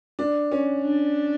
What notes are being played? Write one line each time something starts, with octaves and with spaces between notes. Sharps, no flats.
D4
C#4
D4